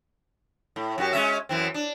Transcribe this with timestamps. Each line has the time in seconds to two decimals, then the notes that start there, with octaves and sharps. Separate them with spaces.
0.76 A2
0.98 F#2 F#4 G4
1.13 G#3 C#4 E5
1.49 F#2 E3 C4
1.74 D4